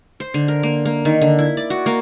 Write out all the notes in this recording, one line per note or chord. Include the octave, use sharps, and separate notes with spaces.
C5
D3
A#4
A#3
A#3
D#3
D3
E4
D5
F#4
A#3